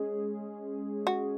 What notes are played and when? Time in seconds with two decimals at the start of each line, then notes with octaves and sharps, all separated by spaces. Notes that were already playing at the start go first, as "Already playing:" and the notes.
Already playing: G#3 C#4 G#4
1.07 F#4